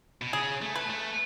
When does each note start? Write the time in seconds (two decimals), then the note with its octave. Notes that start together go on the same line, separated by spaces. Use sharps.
0.22 B2
0.33 C#3 G#4
0.62 A3
0.75 B4
0.90 A3